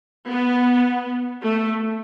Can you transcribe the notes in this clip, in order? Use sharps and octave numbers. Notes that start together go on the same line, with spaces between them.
B3
A3